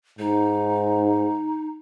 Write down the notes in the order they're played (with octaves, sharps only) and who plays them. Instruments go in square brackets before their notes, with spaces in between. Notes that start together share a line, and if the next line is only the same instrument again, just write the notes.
[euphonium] G#2 [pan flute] D#4